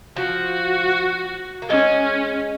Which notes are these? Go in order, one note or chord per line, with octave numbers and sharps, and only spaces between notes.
F3 F#4
A#3
G#3 C#4